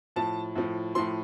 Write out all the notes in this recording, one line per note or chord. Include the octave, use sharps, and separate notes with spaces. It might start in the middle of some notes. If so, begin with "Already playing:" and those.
A2 F3 A5
A2 F3
A2 F3 C6